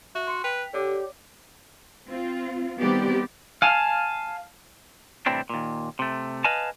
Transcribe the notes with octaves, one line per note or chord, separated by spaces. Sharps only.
F#4 E5
C6 C#7
B4 G5 B6 F7
D3 G4 C#5 D5 D6
C4 F4
D#3 G3 B3 C4 G4 D5
F5 G#5 A5 F6
A2 C3 E3 G3 C4 D4
D#2 A#2
C3 A3
B4 D#5 F5 G#5 A5